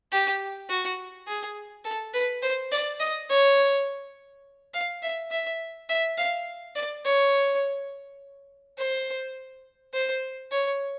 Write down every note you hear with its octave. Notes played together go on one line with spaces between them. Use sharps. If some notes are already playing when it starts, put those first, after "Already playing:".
G4
F#4
G#4
A4
B4
C5
D5
D#5
C#5
F5
E5
E5
E5
F5
D5
C#5
C5
C5
C#5